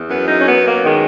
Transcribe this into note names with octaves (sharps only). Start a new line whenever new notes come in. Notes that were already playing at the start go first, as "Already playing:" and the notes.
Already playing: E2
F#2 B3
D#4
C#4
F#3 B3
A#3
D#3 G#3